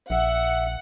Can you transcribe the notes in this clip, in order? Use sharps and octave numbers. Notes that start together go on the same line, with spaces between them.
A#1 E5 F#5